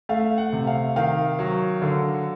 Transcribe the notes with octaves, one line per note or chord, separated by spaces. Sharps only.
A3 F5
F#5
C3
F5
D#3 F5
F#3
D3